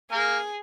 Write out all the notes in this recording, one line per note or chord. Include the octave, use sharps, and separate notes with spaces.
A#3 G#4 A#4